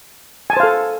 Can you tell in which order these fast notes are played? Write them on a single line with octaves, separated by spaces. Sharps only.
G#5 A5 C5 F5 A4